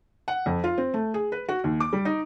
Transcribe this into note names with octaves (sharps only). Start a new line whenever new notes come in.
F#5
F2
F4
C4
A3
G#4
B4
F#4
D#2
D6
G3
D#4